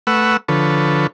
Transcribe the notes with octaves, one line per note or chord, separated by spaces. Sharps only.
A3 B4 F#5 C#6 E6
D3 F3 A4 B4 C#5